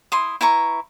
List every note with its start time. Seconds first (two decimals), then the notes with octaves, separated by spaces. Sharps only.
0.12 E4 C6 D#6
0.41 E4 B4 A#5 C#6